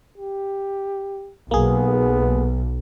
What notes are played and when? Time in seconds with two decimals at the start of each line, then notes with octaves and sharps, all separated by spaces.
0.18 G4
1.51 B1 A#3 B3 G#4